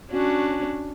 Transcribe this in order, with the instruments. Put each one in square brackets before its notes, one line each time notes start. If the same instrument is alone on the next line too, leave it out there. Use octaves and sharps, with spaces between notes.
[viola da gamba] C#4 D4 F#4